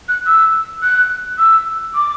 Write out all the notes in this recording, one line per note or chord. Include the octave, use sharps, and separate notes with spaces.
F#6
E6
F#6
E6
D6